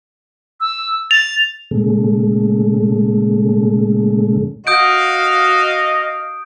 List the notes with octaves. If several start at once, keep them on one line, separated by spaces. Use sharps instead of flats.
E6
A6 F7
A#2 C#3 G#3 A3
F#4 D#5 F5 D#6 G6 D7